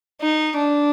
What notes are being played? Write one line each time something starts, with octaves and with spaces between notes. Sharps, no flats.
D#4
D4